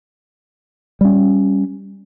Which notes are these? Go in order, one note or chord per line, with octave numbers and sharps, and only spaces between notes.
G3 C#4